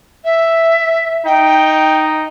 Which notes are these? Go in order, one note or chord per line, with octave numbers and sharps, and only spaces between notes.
E5
D#4 G5